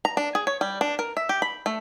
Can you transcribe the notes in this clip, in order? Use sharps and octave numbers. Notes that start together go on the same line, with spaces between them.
A#5
D4
G#4
C#5
G3
D4
A#4
E5
G4
B5
A3